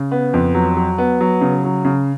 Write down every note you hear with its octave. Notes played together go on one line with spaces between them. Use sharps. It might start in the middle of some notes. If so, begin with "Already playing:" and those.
Already playing: C#3
B3
F2
F#3
F#3
B3
F#3
C#3
F#3
C#3